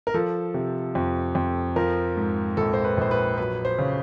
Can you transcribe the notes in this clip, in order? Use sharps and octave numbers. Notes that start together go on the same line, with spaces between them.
A#4
F3 A4
C3
F2
F2
F3 A#4
G#2
A#1 A4
C5
B4
A#1 C5
B4
F#3 B4
C5
C#3